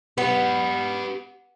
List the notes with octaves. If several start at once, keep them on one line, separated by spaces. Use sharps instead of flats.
B3 G4 B4